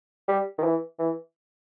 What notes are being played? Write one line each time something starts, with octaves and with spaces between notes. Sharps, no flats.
G3
D#3
E3
E3